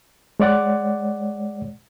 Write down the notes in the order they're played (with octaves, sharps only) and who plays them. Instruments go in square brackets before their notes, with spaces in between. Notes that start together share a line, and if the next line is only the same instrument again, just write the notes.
[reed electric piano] G#3 C#5 D5 F#5 D6